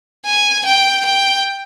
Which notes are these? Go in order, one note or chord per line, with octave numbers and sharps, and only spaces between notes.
G#5
G5
G5